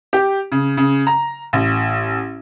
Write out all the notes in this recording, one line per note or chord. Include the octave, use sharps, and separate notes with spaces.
G4
C#3
C#3
A#5
A1